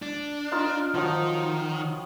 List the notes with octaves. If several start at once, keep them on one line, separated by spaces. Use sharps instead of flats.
D4
D#4 F4 F5
D#3 F3 F#3 D#6